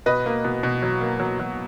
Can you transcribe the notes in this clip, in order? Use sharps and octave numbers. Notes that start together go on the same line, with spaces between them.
B2 B4 D#5
A#3
B2
B2
F#3
A#3
F#3
F#3